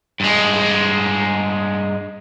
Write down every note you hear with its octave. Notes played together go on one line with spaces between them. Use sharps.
G2 G#3